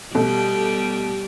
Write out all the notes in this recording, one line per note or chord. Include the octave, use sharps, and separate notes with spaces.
B2 G3 A3 G4